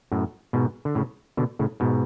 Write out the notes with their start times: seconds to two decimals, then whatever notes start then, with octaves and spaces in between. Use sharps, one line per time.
0.12 F#2 A2
0.53 G#2 B2
0.85 D3
0.95 A2 C#3
1.37 B2 D3
1.59 A2 C#3
1.80 G#2 B2